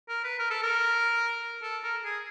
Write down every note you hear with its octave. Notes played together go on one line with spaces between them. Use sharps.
A#4
B4
A#4
A4
A#4
A4
A#4
G#4